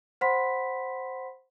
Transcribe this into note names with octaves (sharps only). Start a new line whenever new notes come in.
C5 F#5 B5 C6 B6